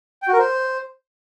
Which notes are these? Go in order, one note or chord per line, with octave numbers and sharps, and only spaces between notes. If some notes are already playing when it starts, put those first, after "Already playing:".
G5
F#4
A#4
C5